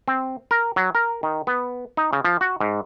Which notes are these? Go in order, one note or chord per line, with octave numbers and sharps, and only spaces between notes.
C4
A#4
F#3
A#4
D#3
B3
D#4
C#3
F3
F#4
G#2